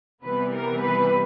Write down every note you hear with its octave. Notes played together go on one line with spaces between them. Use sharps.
C3 E3 G3 B3 B4
A#4
B4